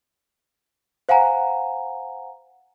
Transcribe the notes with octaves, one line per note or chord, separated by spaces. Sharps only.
C5 F5 F#5 G#5 A#5